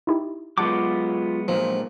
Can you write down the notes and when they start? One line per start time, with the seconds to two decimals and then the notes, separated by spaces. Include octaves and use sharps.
0.07 D#4 E4 G4
0.58 F#3 G#3 B3 F4 F#5 A5 D6 G6
1.48 A#2 F3 F#3 G#3